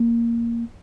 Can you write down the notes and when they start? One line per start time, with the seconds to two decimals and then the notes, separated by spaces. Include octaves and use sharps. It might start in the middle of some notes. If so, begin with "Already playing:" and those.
Already playing: A#3